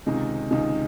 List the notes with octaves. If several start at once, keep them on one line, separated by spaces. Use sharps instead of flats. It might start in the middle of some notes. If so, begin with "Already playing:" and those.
C#2 C3 D#3 G#3 D#4
C#2 C3 D#3 G#3 D#4